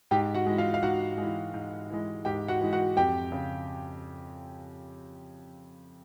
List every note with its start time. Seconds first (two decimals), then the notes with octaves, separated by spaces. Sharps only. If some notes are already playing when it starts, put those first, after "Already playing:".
0.11 G#2 G4 G5
0.35 F#4 F#5
0.46 E3 G#3
0.58 F4 F5
0.74 F5
0.83 G#2 F#4 F#5
1.18 E3 G#3
1.54 G#2
1.90 E3 G#3
2.25 G#2 G4 G5
2.48 F#4 F#5
2.61 E3 G#3
2.73 F#4 F#5
2.97 F2 G4 G5
3.32 C#3